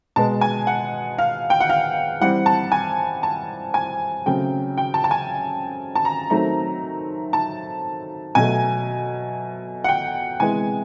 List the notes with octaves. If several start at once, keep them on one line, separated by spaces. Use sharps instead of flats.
B2 G#3 B3 A5
G#5
F#5
F5
G5
F#5
F5
E3 G3 C4 F#5
A5
G#5
A5
G#5
C#3 F#3 A3 C4 G5
G5
A5
A5
G#5
A5
A#5
D#3 F#3 A3 C4 A#5
A5
B2 F#3 A3 G#5
F#5
G5
C3 E3 G#3 B3 G#5